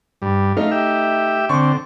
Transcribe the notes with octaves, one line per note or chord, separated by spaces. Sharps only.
G2
A3 D#4 F5
G4 E5
D3 C4 C#6